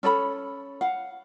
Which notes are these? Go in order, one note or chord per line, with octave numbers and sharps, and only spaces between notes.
C#4 A4 D5 B5
F5 F#5